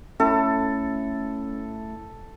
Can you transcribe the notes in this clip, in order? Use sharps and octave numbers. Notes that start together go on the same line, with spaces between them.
A3 C#4 E4 A4